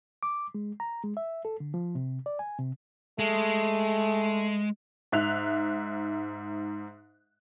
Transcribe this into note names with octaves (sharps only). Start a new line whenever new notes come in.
D6
G#3
A#5
G#3
E5
A4
D3
F3
C3
D5
G#5
C3
G#3 A3
G#2 E5 F#6 F7